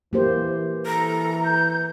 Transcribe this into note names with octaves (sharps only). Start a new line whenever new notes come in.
E3 A#3 G4 C5
E3 A4 A#5
G6